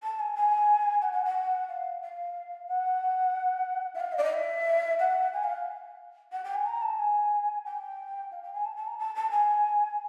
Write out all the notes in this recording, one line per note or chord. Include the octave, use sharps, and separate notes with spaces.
A5
G#5
G#5
F#5
F#5
F#5
F5
F5
F#5
E5
F5
D#5
D5
D#5
E5
F#5
G#5
F5
F#5
G5
G#5
A#5
A5
G#5
G5
F5
G5
G#5
A5
A5
A#5
A5
A5
G#5